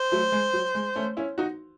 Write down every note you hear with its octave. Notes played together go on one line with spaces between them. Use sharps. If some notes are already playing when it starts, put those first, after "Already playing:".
Already playing: C5
F#3 A3
G#3
F#3
G#3
A3 C#4
C#4 E4
D#4 F#4